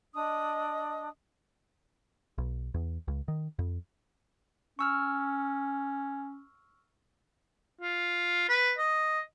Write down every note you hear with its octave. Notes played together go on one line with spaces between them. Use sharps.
D4 D#5 D#6
B1
E2
C#2
D#3
F2
C#4 C#6 E6 F6
F4
B4
D#5